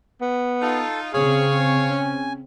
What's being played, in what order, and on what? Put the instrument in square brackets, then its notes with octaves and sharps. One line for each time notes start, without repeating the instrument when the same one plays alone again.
[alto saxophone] B3
[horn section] D#4 F4 [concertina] A4 A5
[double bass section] C#3 C4 [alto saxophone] G#4 [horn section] C#5 F5 [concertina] G#5
[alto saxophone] C#4